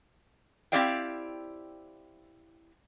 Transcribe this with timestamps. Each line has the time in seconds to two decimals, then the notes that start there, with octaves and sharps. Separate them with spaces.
0.72 C4 E4 G4 D5 F5 G5